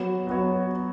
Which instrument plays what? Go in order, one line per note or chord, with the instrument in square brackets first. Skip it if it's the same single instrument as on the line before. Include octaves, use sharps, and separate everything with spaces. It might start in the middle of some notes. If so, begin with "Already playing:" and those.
Already playing: [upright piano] F#3 B3 F#4 C#5
F#3 B3 F#4 C#5